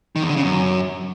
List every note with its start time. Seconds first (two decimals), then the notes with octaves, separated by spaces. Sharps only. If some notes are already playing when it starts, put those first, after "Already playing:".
0.16 D#3
0.23 E2
0.29 D3
0.36 C#3
0.43 F#2